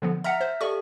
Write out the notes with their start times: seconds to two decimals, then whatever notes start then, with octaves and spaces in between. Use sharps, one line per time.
0.02 D3 F3 B3
0.24 E5 F#5 A#5 F6 B6
0.41 C5
0.61 G4 A4 D5 F5 C#6